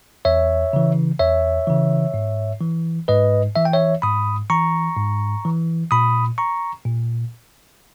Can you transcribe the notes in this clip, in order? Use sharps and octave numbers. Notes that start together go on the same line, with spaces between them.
E2 C#5 E5
C#3 E3
E2 C#5 E5
C#3 E3
G#2
E3
G#2 B4 D#5
E3 E5
G5
C#5 E5
G#2 B5 D#6
E3 A#5 C#6
G#2
E3
A#2 B5 D#6
A#5 C#6
A#2